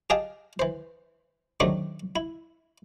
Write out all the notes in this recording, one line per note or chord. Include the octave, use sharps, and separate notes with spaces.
G4 G#4 D#5 F5 G5 A5
E3 C5
D#3 F#3 A3 C4 D4 G4
E4